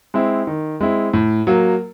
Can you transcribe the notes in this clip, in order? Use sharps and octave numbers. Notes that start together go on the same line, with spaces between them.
G#3 C4 E4
D#3
G#3 C4 E4
A2
F#3 A#3